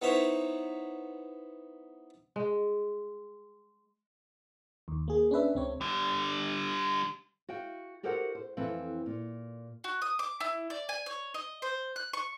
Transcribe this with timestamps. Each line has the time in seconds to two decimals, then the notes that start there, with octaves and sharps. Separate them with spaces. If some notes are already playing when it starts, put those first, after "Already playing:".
0.02 B3 D#4 E4 C5 C#5
2.36 G#3
4.88 D#2
5.08 A#3 G#4
5.31 C#4 D4 B4 E5
5.55 C#2 C4 C#5
5.81 D3 G3
7.49 F#4 F5 G5
8.03 F#4 G4 A4 A#4 C5 F#5
8.35 C5
8.57 F2 E3 C4 A4 B4 F5
9.06 A#2
9.84 F#4
10.02 D#6
10.19 D6
10.40 E4
10.70 D5
10.89 G#5
11.06 C#5
11.34 D#5
11.62 C5
11.96 F#6
12.13 C#6